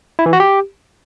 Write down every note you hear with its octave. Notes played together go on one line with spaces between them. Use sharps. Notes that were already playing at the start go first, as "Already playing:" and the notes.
E4
E3
F#4
G4